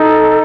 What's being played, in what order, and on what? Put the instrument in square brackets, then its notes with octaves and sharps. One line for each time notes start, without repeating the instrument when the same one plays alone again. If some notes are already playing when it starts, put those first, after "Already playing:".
Already playing: [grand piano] D#4 [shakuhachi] A4